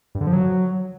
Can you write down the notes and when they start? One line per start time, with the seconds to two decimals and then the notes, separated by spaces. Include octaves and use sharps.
0.15 G2
0.21 D3
0.27 F3
0.33 F#3